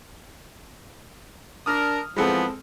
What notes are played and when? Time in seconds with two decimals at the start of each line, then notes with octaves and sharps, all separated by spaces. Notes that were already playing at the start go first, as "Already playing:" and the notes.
1.66 D4 A#4 D#6 F6
2.16 E3 F3 G#3 B3 C4 A4